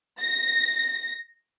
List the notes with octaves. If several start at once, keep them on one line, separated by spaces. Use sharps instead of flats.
A#6